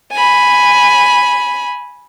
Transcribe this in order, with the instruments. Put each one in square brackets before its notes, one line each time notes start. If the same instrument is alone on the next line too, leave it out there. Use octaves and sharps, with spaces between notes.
[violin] G#5 B5